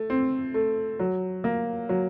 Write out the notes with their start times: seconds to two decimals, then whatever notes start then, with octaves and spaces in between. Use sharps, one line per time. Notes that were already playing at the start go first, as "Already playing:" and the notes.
Already playing: A3
0.10 C4
0.54 A3
1.00 F#3
1.44 A#3
1.89 F#3